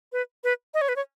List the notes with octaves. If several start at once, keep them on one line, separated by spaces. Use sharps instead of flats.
B4
B4
D#5
C#5
B4
C#5